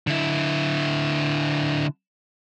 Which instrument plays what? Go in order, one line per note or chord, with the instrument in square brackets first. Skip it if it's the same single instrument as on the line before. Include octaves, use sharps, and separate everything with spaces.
[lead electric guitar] D3 E4